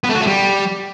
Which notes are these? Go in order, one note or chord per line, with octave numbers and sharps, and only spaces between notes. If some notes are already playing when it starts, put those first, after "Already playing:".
B3
A3
F#4
A3
G3